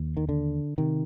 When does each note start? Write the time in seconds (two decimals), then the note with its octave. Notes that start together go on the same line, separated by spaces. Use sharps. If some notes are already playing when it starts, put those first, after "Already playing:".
Already playing: D#2
0.17 D#3
0.29 D3
0.78 C3 D#3